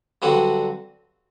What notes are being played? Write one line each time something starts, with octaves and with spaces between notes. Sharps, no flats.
G2 D3 F#3 C4 F#4